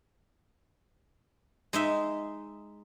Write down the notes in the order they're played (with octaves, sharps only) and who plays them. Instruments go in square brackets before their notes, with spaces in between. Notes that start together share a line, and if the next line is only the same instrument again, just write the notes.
[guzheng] G#3 D#4 E5